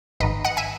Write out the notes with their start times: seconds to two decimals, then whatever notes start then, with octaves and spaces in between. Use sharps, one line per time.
0.20 G#1 G#2 D#3 B4 D#5
0.45 D#5 F#5
0.57 E5 G#5